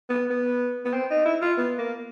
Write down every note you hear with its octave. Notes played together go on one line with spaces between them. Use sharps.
B3
B3
B3
C4
D#4
E4
F4
B3
A#3